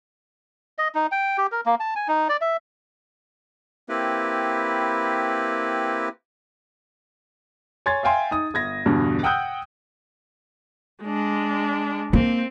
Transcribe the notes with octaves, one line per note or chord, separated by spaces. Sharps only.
D#5
D#4
G5
G4
A#4
A#3
A5
G#5
D#4
D5
E5
A#3 C4 E4 G4 B4
C#5 G#5 C6 G#6 A6
E5 F5 G5 G#5 C6
D#4 D#6
G1 G#6 A#6
E2 G2 B2 D3
F#5 G5 D#6 E6 F#6 G6
G#3 D4
A#3 C4